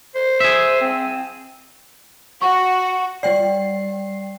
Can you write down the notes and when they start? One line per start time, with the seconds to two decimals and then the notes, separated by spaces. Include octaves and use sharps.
0.14 C5
0.40 G#4 E5
0.81 C4
2.42 F#4 C#6
3.23 G3 D5 G5 C7